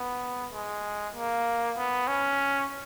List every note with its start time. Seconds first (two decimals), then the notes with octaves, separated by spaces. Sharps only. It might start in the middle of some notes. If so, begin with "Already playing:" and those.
Already playing: B3
0.53 G#3
1.15 A#3
1.77 B3
2.08 C#4